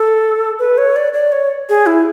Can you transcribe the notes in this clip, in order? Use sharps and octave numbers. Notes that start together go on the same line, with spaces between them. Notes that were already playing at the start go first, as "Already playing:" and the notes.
Already playing: A4
B4
C#5
D5
D5
C#5
G#4
E4